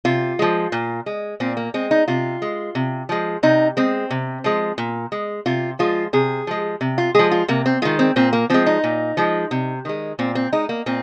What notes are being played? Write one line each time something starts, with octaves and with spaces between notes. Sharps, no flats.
C3 F4
F3 G#3
A#2
G#3
A#2 C4
A#3
G#3 C4
D#4
C3 F4
G#3
C3
F3 G#3
C3 D#4
G#3 C4
C3
F3 G#3
A#2
G#3
C3 F4
F3 G#3 F4
C3 G#4
F3 G#3
C3
F4
F3 G#3 G#4
F4
C3 A#3
C4
D#3 G#3 F4
C4
A#2 C4
A#3
F3 G#3 C4
D#4
A#2
F3 G#3
C3
D#3 G#3
A#2 C4
C4
G#3 D#4
A#3
A#2 C4